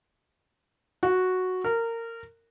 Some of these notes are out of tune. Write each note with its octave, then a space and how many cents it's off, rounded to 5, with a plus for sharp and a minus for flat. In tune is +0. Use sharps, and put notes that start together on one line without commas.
F#4 -5
A#4 -20